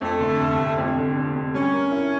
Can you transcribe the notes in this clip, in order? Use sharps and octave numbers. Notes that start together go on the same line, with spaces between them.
F2 A3
D3
F1
F1
F2
D3
F1
F1
G3 C#4
A#3
E4